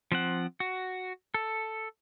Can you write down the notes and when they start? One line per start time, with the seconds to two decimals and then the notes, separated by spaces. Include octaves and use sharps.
0.12 F3 C4 F#5
0.60 F#4
1.34 A4